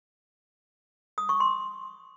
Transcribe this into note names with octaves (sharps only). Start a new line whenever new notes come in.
D#6
C#6
C6